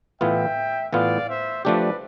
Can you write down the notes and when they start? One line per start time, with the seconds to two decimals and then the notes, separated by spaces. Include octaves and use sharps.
0.20 A2 E3 B3 F4 E5 G5
0.93 A2 E3 B3 F4 D5 F5
1.28 C5 E5
1.65 F3 A3 D4 G4 B4 D5